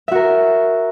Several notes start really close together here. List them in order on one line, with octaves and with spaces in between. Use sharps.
E5 F#4 A#4